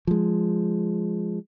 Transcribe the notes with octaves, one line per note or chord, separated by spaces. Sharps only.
F3 G#3